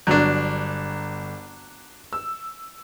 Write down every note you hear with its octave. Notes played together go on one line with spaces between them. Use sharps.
G1 F#3 D4
E6